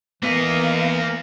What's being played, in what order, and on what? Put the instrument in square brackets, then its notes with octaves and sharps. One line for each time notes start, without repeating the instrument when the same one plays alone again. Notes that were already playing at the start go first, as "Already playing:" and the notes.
[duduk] E3 [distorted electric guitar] A#3 D#5 [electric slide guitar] B3 [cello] A#4 F5